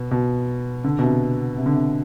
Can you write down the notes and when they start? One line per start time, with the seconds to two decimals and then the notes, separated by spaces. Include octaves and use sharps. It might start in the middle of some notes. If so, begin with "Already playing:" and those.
Already playing: B2
0.11 B2
0.84 D3
0.99 B2
1.03 C3
1.58 C3
1.66 D3
1.74 C3